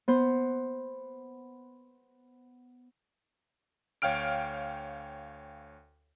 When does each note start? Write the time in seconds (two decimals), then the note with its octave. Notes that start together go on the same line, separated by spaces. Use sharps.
0.08 B3 C5
4.02 D2 C#5 F5 G5 F6 D7